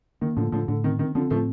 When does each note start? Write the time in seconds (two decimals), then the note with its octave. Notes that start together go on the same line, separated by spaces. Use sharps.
0.21 D#3 A#3
0.37 A2 D3 F3
0.52 A2 D3 F3
0.68 A2 D3
0.84 D#3 C4
0.99 D#3 C4
1.15 D3 F3 C4
1.30 A2 F3 A3